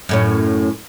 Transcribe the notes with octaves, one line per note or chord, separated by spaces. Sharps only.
F#2 A2 C#4